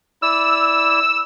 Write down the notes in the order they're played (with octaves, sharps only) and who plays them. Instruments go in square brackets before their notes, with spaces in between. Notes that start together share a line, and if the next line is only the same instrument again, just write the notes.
[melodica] E4 D5 [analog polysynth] E6